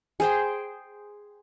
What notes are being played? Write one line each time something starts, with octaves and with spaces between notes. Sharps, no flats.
G#4 C5 G5